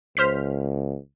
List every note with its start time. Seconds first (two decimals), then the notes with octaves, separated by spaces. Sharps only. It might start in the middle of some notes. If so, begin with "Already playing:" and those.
0.17 C#2 C5 F6 B6